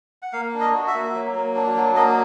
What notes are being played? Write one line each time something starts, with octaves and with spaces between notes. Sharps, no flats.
F#5
A#3 F5
D4
D#5
F#4
E5
A#3
F#3
A#3
D4
F#3
A#3 D#5